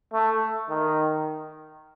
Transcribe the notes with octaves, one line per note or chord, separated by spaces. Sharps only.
A3
D#3